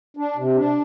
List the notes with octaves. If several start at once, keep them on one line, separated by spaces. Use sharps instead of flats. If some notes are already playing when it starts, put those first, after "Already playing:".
D4
C3
D4